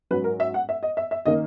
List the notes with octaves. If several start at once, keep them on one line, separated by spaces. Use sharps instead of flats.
G#2 F#3 C#4 B4
A#4
E5
F#5
E5
D#5
E5
E5
D#3 A#3 C#4 D#5